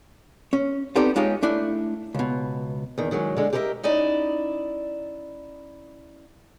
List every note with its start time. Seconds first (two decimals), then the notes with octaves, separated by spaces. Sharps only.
0.53 C#4
0.96 B3 C4 D#4 G4 A4 D5
1.16 G#3 D#4 F4 G4 G#4 C#5
1.43 A3 D4 E4
2.15 C#2 B2
2.98 E2 D#3
3.11 D#3 F#3 G#3 C#4
3.37 D3 G#3
3.53 G4 G#4 A#4 B4 D#5 E5
3.83 C#4 D#4 E4 D5